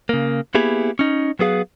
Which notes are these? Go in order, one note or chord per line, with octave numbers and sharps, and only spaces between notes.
C#3 A#3
A#3 B3 E4 G4 G#4
C#4 D#4
F#3 B3 G#4 F5